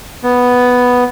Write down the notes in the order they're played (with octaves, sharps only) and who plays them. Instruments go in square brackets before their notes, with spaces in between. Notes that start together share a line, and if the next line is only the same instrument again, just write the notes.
[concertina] B3